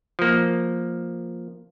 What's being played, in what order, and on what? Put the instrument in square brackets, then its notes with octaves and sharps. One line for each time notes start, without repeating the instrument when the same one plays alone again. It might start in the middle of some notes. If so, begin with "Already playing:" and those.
[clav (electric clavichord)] F3 A#3